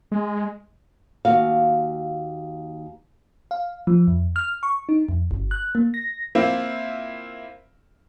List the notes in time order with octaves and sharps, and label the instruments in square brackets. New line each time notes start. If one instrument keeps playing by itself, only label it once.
[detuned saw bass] G#3
[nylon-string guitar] D#2 F#4 F5
[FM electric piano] F5
F3
F2
F6
C#6
D#4
F2
G1
F#6
A#3
A#6
[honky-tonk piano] A#3 C4 E4 F4